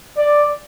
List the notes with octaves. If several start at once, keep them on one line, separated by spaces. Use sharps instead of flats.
D5